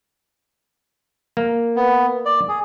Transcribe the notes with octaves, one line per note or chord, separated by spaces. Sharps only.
A#3
B3
D5
G#4